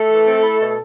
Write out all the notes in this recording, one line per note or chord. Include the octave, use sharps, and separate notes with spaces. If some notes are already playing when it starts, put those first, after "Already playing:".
Already playing: A3 A4
E3
C4
E4
B2